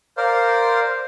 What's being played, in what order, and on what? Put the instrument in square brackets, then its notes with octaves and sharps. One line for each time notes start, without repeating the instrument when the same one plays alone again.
[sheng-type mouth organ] A#4 C5 D5 F5 C6